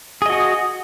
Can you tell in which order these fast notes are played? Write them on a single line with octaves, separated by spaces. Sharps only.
G#4 D#5 F#4